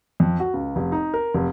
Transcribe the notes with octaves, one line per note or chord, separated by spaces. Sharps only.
F2
F#4
C#2
F1
D#4
A#4
F1